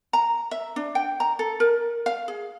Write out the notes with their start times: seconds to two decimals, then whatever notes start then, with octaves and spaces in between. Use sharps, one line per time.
0.13 A#5
0.51 E5
0.76 D4
0.95 G5
1.20 A#5
1.39 A4
1.60 A#4
2.06 F5
2.28 G#4